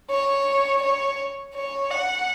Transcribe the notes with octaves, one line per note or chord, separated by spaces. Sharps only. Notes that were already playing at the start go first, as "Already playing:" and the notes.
C#5
C#5
C#5
F#5